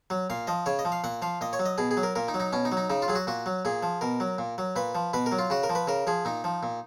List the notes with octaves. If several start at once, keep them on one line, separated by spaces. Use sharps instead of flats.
F#3
A#2 F5
F3 D#5
C#3 C#5
D#5
F3
F5
A#2 F#5
F3 F5
A#2 D#5
C#5
F#3
D#5
B2 G#4
G#4
F#3
A#4
A#2 A#4
D#4
F#3
D#4
B2 C#4
D#4
F#3
D#4
C#3 D#4
F4
F#3 G#4
F#4
A#2 F#4
F#3
A#2 G#4
F3
B2 A#4
F#3
A#2
F#3
A#2 B4
F3
B2 B4
A#4
F#3
F4
C#3 F#4
A#4
F3
B4
C#3 A#4
F3 G#4
A#2 D#4
F3
A#2